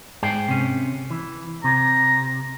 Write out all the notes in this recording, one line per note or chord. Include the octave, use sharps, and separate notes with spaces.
G#2 G#4 G5
C3 C#4
E3
C3 A#5